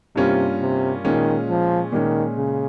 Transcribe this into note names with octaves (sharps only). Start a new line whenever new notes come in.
G2 C3 G3 A#3 C#4 F4
C3
A#2 D#3 G#3 C#4 F4
F3
A#2 D#3 G#3 C#4
C#3